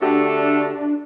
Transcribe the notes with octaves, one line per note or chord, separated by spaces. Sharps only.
D3 A3 D4 F#4 G4 A4